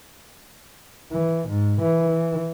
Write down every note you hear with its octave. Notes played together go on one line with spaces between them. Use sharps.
E3
G#2
E3